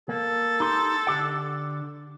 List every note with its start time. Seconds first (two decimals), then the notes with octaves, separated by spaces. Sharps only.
0.09 A#3 A4
0.60 D#4 G4 C6
1.07 D3 G4 F#5